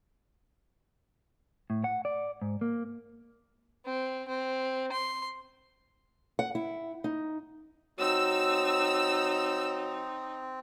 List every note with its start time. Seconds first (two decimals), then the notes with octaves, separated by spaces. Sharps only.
1.70 A2
1.84 F#5
2.05 D5
2.42 G#2
2.61 A#3
3.85 C4
4.28 C4
4.92 C6
6.39 F#5
6.55 E4
7.04 D#4
7.99 F#3 C4 D#4 E6